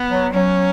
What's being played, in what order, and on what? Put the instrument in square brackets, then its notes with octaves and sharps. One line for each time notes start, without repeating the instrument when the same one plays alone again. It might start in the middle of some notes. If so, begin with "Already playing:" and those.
Already playing: [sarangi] B3
[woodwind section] F#3
[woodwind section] F#3 [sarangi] C#4